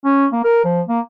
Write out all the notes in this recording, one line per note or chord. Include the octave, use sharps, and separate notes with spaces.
C#4
A#3
A#4
F3
A#3